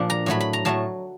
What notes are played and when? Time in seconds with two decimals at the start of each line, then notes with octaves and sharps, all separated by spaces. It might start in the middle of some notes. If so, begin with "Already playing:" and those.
Already playing: A#2 F3 D4
0.10 A#5
0.26 A2 F#3 A3 B5
0.40 B5
0.53 A#5
0.65 A2 F#3 A3 A5